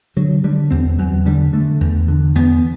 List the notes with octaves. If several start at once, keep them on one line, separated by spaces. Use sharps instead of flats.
D3 F#3
D3 G3
E2 C4
E2 F#3
D3 G3
D3 A3
E2
D3
E2 B3